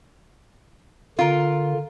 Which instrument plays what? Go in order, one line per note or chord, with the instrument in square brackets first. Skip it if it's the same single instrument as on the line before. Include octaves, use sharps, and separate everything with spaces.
[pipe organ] D3 [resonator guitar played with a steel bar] F4 A#4